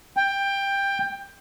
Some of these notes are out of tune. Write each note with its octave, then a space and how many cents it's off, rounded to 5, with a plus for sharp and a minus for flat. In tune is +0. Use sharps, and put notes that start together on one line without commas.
G5 +15